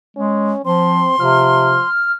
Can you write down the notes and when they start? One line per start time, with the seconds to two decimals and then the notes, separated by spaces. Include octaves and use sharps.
0.17 G#3 C#4
0.66 F3 C4 C6
1.20 C3 F3 F6